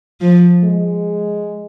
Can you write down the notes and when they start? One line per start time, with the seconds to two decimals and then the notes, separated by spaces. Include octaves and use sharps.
0.21 F3
0.63 G#3